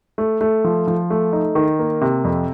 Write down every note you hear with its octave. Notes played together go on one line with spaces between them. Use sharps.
A3
A3
F3
F3
A3
D#4
D#3
A#3
C3
F2